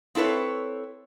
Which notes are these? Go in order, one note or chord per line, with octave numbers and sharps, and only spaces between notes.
C4 E4 A4 B4 C#5